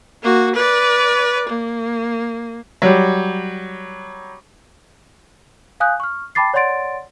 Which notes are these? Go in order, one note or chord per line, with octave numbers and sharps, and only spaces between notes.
A#3 F#4
B4 D5
A#3
F#3 G3
F5 G#5 D#6 F#6 G6
C#6 F6
G5 A5 B5 D6 A6 C7
C#5 D5 F#5 C6 A6 D7